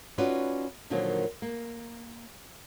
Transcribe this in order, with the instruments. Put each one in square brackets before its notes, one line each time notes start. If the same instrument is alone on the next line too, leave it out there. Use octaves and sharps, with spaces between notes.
[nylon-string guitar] C#4 D#4 F4 F#4 B4 D5
A#2 D3 D#3 F3 F#3 A#3
A#3